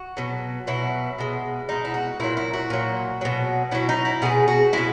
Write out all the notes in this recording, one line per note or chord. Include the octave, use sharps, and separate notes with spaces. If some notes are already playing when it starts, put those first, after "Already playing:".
Already playing: F#4
B2 F#3
B2 F#3 E4
B2 G#3
B2 G#3 D#4
E4
F#4
A#2 F#3 E4
E4
F#4
A#2 F#3
B2 F#3
B2 F#3 E4
D#4
E4
B2 G#3 G#4
F#4
B2 G#3 E4